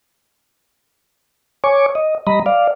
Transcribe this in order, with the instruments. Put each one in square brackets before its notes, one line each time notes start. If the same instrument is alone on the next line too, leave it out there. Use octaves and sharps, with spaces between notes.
[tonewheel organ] C#5 G#5 C#6 D6
D#5
G3 D#5 A#5 B5
D5 F5